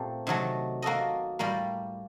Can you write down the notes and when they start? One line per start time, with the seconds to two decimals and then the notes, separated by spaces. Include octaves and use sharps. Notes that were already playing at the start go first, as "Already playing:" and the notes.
Already playing: A#2 A3 C4 G4
0.27 C3 D#3 F#3 A3
0.82 A#3 F#4 A4 D#5
1.39 A2 G3 A#3